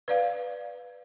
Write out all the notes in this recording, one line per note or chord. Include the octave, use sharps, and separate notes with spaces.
B4 D5 F5